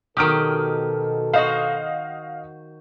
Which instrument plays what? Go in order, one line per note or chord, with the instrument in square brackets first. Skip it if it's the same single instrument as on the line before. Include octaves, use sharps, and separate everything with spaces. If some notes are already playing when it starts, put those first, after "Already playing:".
[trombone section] B2 A4 [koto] D#3 F#3 G4 [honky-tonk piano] D#6 F6 D7
[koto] F#4 C5 [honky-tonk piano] D#5 F5